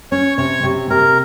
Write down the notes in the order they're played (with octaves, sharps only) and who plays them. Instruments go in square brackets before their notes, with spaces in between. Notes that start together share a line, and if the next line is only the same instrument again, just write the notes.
[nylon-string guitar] C#4 [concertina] C#5
[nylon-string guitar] C3 [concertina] C#5
[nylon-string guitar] C3
[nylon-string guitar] C3 [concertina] A#4